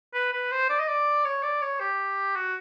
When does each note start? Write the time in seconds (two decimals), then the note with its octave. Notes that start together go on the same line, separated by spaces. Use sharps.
0.14 B4
0.33 B4
0.51 C5
0.69 D5
0.79 D#5
0.88 D5
1.25 C#5
1.43 D5
1.62 C#5
1.80 G4
2.36 F#4